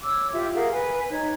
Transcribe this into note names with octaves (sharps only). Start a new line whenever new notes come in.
C#5 D6 E6
F4 G4 E5
G#4 A#4 F5 F#5
B4 G#5
D#4 C#5